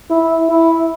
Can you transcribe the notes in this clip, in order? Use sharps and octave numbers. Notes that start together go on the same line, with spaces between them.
E4
E4